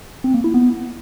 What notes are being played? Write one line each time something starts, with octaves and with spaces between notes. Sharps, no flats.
C4
A#3
E4
B3